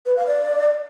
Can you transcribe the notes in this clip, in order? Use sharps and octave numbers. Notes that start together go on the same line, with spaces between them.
B4
F5
D5